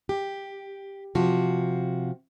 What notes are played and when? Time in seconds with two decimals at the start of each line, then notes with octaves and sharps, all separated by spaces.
0.09 G4
1.15 C3 F3 F#4